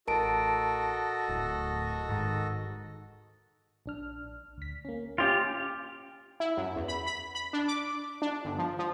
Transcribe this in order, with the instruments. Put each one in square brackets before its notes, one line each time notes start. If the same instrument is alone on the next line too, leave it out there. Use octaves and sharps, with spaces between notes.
[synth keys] A1 [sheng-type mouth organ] F#4 A4 D#5 [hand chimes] A#4 A5 D7
[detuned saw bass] D1 [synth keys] A2
[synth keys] G#2 D#3
[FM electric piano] A#1 D4 F6
D2 B6
A#3 C#4
[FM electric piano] C#4 G5 G#5 [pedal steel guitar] F4 G4
[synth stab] E4
F#2
E2
B5
B5
B5
D4
D6
D4
G1
F3
F3